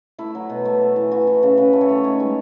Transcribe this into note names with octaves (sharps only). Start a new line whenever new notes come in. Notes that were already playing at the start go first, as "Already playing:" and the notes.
A3 E4
F#3
B2
A3
A3
E3
E3 F#4
E3
A4
C#3
C#3 B4
A3
C#5
A3
D#3 C#5
G#3